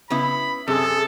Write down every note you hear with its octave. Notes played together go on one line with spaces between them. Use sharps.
C#3 B3 E4 B5
F#2 C3 G#4 A4 A5 E6